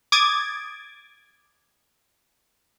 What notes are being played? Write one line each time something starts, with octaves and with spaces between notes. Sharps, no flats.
D6 D#6 G#6 A6